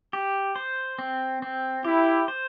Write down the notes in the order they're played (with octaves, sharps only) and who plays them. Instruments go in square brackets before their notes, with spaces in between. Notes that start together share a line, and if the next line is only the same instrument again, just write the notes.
[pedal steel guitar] G4
C5
C4
C4
[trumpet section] E4 [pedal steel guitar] G4
[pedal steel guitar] C5